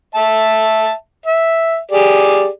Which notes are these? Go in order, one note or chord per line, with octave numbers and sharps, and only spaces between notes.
E5 A5
E5
G4 G#4 D5